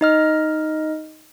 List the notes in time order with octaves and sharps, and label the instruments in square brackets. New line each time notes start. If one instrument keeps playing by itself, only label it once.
[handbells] D#4 D#5 F6